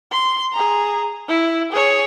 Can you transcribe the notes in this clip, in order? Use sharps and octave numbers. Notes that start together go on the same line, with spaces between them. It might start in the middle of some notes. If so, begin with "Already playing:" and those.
C6
G#4 A#5
E4
G#4 C#5